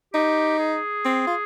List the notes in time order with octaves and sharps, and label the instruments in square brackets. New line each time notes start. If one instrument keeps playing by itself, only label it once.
[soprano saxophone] D#4 [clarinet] G4
[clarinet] G#4
[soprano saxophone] C4
F4